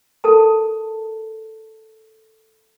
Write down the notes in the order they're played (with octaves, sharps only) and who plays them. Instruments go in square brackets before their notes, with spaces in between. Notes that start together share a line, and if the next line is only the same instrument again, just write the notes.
[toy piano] A4 A#4 A5